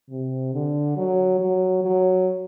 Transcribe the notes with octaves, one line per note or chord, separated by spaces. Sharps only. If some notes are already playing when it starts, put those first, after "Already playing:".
C3
D3
F#3
F#3
F#3